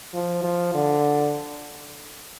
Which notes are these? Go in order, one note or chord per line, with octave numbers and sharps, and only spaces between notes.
F3
F3
D3